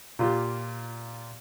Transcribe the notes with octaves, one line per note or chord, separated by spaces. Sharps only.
A#2 F4 G4